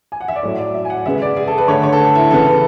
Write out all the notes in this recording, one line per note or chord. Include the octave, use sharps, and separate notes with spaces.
G#5
F#5
E5
D5
A2 F#3 A3 C#5
D5
E5
G#5
F#5
C#3 G#3 B3 E5
D5
G#4
A4
B4
D3 A3 C#5
C#5
A4
B4
E4
C#3 E3 B3 A4
B4